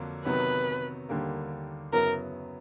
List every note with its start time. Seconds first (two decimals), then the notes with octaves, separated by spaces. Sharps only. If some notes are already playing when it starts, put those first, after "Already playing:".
Already playing: F2 D3 F#3 A#3
0.26 C3 D#3 F#3 B3 B4
1.09 D#2 D3 G3 A#3
1.93 F#2 C#3 F#3 B3 E4 A#4